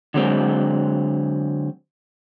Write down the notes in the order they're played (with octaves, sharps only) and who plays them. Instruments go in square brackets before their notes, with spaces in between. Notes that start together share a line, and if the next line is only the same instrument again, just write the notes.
[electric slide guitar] D3 F#3 G#3 C4